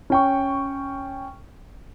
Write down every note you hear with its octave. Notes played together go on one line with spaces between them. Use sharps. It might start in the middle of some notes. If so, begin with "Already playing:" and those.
C#4 G5 C#6